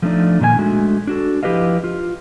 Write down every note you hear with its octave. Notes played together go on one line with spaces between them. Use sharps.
F3 A3 C4 D4 D#4 D5
A#2 D#3 D4 G#5
G#3 A3 D4 F#4
D4 F#4 A4
F3 E4 G4 B4 D#5 F5
F4